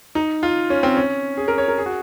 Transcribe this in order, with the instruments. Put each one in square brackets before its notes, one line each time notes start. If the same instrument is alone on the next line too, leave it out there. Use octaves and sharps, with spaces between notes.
[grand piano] D#4
F4
C#4
C4
C#4
G#4
A#4
C#5
A#4
G#4
F#4